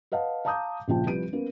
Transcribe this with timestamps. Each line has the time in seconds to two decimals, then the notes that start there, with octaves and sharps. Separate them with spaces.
0.12 B4 D#5 F5 F#5 A5
0.45 F5 A5 A#5 D6 D#6 G6
0.88 A#1 C#3 F3 G5 A5
1.05 C2 F3 G3 B4 D7 D#7
1.33 A#3 B3 C#4